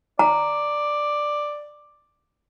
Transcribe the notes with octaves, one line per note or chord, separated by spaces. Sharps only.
D5 A#5